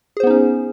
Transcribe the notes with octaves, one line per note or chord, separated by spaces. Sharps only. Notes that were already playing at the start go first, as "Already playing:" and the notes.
B3 C#4 D#4 G#4 C5